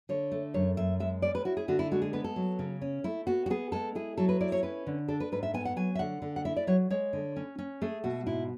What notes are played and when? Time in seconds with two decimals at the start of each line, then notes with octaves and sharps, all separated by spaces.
0.09 D3 C#5
0.32 A3
0.54 F#2 C#5
0.77 F#2 E5
1.00 G#3 E5
1.22 C#4 D5
1.35 B4
1.45 E4 F#4
1.57 G#4
1.68 D3 F#4
1.79 E4
1.91 G#3 F#4
2.02 G#4
2.13 B3 B4
2.24 A4
2.36 F#3
2.59 C#3
2.82 C#4
3.04 A3 E4
3.27 B3 F#4
3.46 F#4
3.50 B3 G#4
3.72 G#3 A4
3.95 E4 G#4
4.17 F#3 A4
4.29 B4
4.41 E4 D5
4.52 C#5
4.63 C#4 B4
4.87 D3
5.08 D4 A4
5.20 B4
5.32 G#2 B4
5.43 E5
5.54 B3 G#5
5.65 F#5
5.76 F#3 G#5
5.95 E5
5.99 D3 F#5
6.22 D3
6.36 F#5
6.45 E4 E5
6.56 D5
6.67 F#3 C#5
6.90 G#3 C#5
7.13 D3
7.36 C#4
7.58 C#4
7.82 A3 G#4
8.04 B2 F#4
8.26 G#2 E4